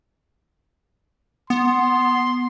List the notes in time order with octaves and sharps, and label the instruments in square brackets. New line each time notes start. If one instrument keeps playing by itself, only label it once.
[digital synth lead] B3 [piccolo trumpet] C6